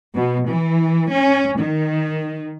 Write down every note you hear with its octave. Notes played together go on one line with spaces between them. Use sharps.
B2
E3
C#4
D#3